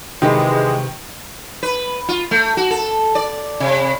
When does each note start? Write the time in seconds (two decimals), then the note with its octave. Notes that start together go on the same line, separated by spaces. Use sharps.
0.22 C3 D#3 E3 G#3 G4 B4
1.63 B4
2.08 F4
2.31 A3
2.57 F#4
2.71 A4
3.15 D5
3.60 C3